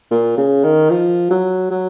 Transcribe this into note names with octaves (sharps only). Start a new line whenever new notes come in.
A#2
C#3
D#3
F3
F#3
F#3